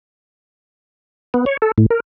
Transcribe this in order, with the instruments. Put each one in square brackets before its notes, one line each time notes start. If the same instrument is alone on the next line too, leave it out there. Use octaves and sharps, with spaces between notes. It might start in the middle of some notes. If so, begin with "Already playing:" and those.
[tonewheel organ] B3
C#5
A4
A2
A#4